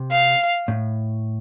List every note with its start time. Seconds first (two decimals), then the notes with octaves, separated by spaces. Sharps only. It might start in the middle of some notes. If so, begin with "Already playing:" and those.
Already playing: C3
0.12 F5
0.68 A2